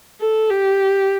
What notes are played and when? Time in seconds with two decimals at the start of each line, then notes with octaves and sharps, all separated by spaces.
0.21 A4
0.50 G4